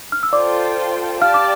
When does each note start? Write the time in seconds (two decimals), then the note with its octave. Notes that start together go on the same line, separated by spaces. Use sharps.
0.12 F6
0.23 E6
0.32 F4 A4 C5 D5 G5 D6
1.21 G4 D5 F5 A5 F6
1.34 D6